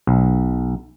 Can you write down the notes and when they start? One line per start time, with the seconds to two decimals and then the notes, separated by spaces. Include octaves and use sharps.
0.07 B1